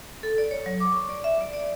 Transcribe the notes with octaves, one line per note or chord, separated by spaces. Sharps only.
A4
D5
C#5
F#3
D6
C#6
D5
E5
D5
D5